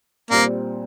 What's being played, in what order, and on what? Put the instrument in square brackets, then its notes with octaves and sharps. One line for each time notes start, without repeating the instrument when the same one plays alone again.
[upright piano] A#2 G3 C4 [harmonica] A#3